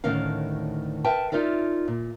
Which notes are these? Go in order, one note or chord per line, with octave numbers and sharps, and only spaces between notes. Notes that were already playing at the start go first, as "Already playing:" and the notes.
D2 A2 D#3 C#4 A#4 F5
A#4 B4 E5 G5 A5
D#4 F4 A#4 D5 E5
A#2